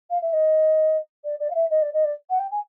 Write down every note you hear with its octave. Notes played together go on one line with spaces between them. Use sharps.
F5
E5
D#5
D5
D5
F5
E5
D#5
D5
D#5
D5
F#5
G5
G#5